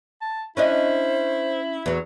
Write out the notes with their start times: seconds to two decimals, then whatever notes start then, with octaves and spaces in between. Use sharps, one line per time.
0.21 A5
0.57 C#4 D4 E4 C5 D#5
1.86 E2 F#3